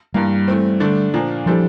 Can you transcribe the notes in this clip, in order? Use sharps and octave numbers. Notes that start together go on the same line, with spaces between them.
G2 E3 G3 A#3
E3 A3 C4
D3 A3 D4
A#2 F3 A#3 D4
E3 F3 G3 D4 A4 C5